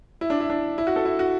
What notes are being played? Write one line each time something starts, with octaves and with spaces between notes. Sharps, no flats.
E4
D4
E4
D4
E4
F#4
A4
E4
F#4